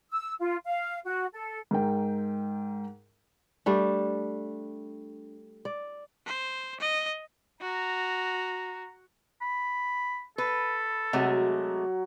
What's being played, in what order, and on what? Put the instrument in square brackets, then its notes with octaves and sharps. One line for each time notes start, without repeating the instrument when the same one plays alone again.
[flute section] E6
F4
F5
F#4
A4
[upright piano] G#2 A#4 G5
[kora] G3 A3 D4
D5
[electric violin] C5
D#5
[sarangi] F#4 [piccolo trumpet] A#5
[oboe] B5
[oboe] A4 [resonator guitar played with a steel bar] B4
[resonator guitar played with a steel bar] C3 G#3 A3 [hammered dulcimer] F#3